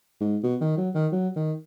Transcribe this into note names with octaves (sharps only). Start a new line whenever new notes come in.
G#2
B2
D#3
F#3
D#3
F#3
D#3